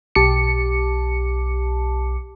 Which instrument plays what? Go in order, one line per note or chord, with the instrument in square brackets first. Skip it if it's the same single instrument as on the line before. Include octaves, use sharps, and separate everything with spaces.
[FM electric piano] B1 G4 A5 D6 C#7